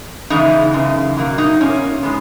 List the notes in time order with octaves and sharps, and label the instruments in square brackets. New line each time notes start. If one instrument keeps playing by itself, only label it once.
[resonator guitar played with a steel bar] C#3 E3 G#3 B3 D#4
F#2 C#3
B2 F#3 A#3
D#4
A#2 A#3 C#4
G#3 B3